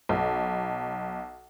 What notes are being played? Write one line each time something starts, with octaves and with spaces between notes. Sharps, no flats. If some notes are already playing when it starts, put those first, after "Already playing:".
B1